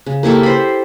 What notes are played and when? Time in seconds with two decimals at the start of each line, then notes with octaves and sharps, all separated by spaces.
0.06 C#3
0.23 A#3 E4 G4 A4
0.43 C5 B5